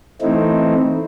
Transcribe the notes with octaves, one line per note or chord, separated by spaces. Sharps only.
E3 A3 C4 D#4 E4